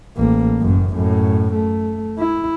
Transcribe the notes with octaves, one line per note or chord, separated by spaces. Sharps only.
A1 A#3
F#1 F#2
F#2 A2
A3
E4